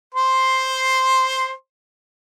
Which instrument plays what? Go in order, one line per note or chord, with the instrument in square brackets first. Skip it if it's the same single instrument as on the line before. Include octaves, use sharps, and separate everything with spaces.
[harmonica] C5 C6